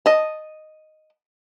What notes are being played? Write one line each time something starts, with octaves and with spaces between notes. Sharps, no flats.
D#5 A5